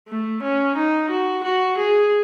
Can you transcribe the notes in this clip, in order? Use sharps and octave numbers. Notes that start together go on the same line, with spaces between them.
A3
C#4
D#4
F#4
F#4
G#4